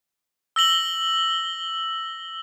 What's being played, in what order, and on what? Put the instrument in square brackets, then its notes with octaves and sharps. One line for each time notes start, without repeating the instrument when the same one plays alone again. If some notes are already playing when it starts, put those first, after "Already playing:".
[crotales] E6 A#6 F#7 G7